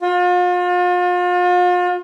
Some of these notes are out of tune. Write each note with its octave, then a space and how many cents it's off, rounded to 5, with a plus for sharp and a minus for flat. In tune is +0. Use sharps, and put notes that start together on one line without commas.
F4 +40